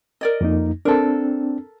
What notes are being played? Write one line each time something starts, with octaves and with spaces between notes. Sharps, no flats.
A#4 D5 D#5
F2 A#3 D#4
C4 D4 A4 A#4